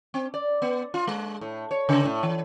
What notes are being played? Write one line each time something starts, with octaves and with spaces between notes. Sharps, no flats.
C4
D5
B3
F4
G#3
A2
C#5
C#3
A2
E3